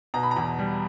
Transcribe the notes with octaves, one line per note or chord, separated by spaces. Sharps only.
B2 A#5
B5
A#5
E2
G3